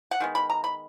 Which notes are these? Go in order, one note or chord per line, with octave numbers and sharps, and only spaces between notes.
F#5
D#3 G#3 B3
B5
A#5
B5